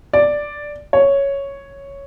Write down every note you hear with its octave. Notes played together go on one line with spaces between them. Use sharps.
D5
C#5